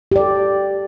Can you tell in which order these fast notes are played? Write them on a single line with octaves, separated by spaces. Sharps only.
G4 D5 A4